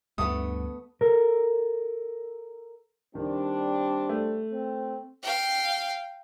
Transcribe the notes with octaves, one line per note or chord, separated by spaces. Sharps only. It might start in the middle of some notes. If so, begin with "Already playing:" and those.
D2 G2 D3 A3 B3 D#6
A4 A#4
D#3 G3 C4 D4
A3
C4
F5 G5